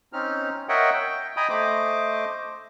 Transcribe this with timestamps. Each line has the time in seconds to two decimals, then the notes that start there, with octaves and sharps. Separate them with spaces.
0.13 C4 C#4 D#4 F6
0.69 A#4 C#5 D#5 E5 F#5 G5
0.93 G5
1.37 D#5 G5 G#5 A#5 B5 D#6
1.49 A3 C5 D#5 D6